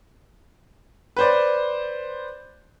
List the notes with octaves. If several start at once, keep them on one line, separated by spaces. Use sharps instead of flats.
B4 C5 D5